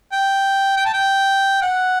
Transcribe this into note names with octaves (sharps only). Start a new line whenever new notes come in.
G5
G5
A5
G5
F#5